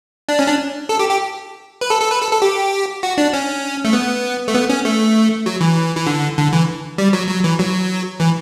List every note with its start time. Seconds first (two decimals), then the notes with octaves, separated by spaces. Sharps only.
0.29 D4
0.39 C#4
0.48 D4
0.89 A4
0.99 G4
1.10 G4
1.81 B4
1.90 A4
2.02 A4
2.11 B4
2.21 A4
2.32 A4
2.42 G4
3.03 F#4
3.18 D4
3.33 C#4
3.85 A3
3.93 B3
4.48 A3
4.54 B3
4.69 C#4
4.85 A3
5.46 F#3
5.61 E3
5.96 E3
6.07 D3
6.37 D3
6.53 E3
6.98 G3
7.13 F#3
7.29 F#3
7.44 E3
7.59 F#3
8.20 E3